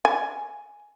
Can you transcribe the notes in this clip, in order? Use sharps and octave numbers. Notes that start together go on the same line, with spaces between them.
G#5